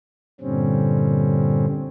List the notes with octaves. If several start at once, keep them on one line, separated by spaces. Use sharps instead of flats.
G2 A#2 D3 G3 C4 C#4